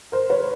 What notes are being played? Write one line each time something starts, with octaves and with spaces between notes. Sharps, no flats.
A#4 C5
B4 C#5